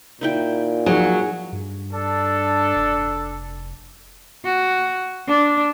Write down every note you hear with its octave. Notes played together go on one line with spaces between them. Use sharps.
A#2 D#4 E4 G5
F3 F#3 D#4 G#4 C#5
G2
D4 A4
F1
F#4
D4